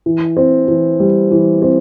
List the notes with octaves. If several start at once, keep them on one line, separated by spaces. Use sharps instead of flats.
E3
C4
E3
G3
E3
C4